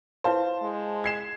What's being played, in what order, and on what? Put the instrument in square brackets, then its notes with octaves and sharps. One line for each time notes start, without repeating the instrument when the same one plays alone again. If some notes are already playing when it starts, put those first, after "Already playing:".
[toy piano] E4 B4 F5 [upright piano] C5 A5
[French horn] G#3
[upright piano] G#6 C7 E7